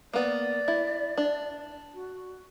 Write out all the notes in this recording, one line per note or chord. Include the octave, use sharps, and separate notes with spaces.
A#3 B3 D5
E4
D4
F#4